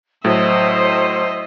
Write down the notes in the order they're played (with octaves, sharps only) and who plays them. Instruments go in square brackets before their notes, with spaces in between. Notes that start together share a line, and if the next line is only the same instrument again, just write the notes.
[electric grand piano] A2 F#3 [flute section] C5 [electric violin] D#5 E5